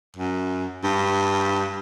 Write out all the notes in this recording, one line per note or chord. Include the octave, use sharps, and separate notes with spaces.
F#2
G2